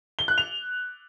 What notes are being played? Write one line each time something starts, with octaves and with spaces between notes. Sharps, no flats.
G7
F#6
F7